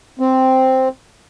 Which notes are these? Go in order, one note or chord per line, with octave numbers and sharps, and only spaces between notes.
C4